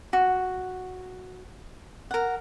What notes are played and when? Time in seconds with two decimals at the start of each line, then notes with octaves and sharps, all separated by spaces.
0.13 F#4
2.11 A#4 F#5